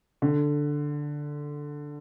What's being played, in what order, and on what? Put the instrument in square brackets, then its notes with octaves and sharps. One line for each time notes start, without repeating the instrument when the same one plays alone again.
[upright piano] D3